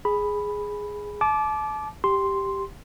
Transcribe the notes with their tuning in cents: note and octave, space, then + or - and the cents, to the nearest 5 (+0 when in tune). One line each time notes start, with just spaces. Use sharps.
G#4 +0 B5 +0
A5 -35 D6 +0
G4 +0 C6 +0